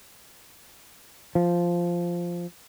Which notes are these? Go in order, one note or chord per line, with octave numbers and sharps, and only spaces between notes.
F3